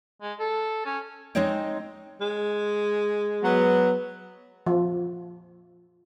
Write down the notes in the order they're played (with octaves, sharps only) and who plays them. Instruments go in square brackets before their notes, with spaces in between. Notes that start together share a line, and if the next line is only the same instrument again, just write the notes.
[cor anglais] G#3
A4
C#4
[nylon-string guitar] G#3 C4 D#4 C#5 D#5 G5
[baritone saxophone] G#3
[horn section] F#3 B3
[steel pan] F3